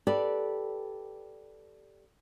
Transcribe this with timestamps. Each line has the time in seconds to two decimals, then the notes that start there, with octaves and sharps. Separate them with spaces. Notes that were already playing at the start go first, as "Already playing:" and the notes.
0.07 G4 A4 B4 D5